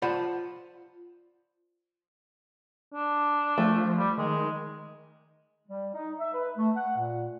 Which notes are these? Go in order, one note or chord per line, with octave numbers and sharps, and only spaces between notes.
F4 C5 D5 F#5 A5 B5
D4
F3 A3
G3
D#3 G#3
G3
D#4
E5
B4
A3
F#5
A#2